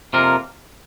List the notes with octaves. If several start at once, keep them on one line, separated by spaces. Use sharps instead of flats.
F2 C3 A#3 F4 A#4